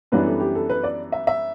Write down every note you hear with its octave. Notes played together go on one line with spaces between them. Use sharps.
F#2 E3 G3 B3 D4 B4
A4
G4
A4
B4
D5
E5
E5